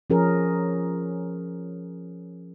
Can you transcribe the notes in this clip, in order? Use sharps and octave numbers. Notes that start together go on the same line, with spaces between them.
F3 C#4 G#4 A#4